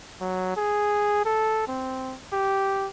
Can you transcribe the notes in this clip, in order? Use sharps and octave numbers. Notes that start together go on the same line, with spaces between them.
F#3
G#4
A4
C4
G4